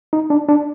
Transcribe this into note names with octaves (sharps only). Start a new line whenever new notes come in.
D#4
D4
D4